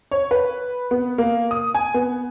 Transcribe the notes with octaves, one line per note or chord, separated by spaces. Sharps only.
C#5
B4
B3
A#3
D#6
G#5
B3